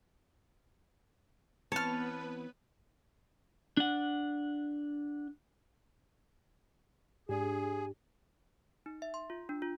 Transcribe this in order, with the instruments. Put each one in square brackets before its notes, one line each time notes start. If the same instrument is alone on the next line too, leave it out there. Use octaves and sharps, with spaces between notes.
[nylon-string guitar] E3 C4 [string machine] B3 B4 [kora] C#5 [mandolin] A5 F6
[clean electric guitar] D4 F#5
[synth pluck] G#2 D4 [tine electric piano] G4 [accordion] G#4 [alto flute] G#5
[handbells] D#4
E5
C6
F4
D4
F4